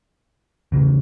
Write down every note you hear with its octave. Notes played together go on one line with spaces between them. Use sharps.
E2 C#3